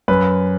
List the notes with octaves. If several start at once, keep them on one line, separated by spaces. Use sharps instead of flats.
F#2 B4